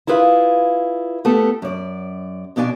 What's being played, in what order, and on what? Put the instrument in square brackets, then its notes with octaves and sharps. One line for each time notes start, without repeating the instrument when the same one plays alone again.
[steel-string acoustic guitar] E4 F4 G#4 B4 F5
A3 B3 G4 A4
F#2 D5
F2 B2 D4 D5 G#5